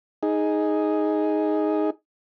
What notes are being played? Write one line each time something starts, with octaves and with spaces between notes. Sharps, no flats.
D#4 G#4